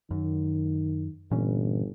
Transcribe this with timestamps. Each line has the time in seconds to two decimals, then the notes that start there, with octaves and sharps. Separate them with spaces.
0.11 F#2 D#3
1.31 G1 A#2 E3 C#4